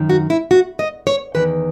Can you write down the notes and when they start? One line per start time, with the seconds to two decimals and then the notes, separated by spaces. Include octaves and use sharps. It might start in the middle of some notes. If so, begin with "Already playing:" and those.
Already playing: F#2 D#3
0.09 F#4
0.30 E4
0.51 F#4
0.79 D#5
1.07 C#5
1.35 E2 D#3 B4